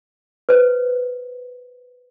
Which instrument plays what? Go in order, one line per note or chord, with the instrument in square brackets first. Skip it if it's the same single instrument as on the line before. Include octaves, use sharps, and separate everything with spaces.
[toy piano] B4 C5